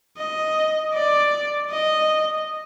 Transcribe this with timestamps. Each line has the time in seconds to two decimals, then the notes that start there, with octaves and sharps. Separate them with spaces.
0.18 D#5
0.94 D5
1.71 D#5